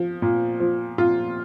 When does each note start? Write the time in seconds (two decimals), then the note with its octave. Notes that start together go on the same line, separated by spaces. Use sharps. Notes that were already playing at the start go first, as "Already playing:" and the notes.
Already playing: F3
0.22 A#2
0.60 F3
0.98 A#2 F4